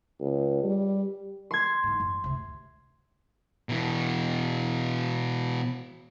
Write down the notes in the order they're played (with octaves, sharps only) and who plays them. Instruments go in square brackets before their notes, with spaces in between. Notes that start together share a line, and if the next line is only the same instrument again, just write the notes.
[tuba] C#2
G3
[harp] C6 G#6
[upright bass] G#2 E3
F#2
D2 C3
[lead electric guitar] B2 E3